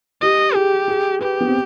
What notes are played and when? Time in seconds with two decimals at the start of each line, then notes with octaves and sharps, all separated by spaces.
0.22 G4 D#5
0.55 G4 G#4
0.88 G#4
1.21 G4 B4
1.41 B3
1.48 C4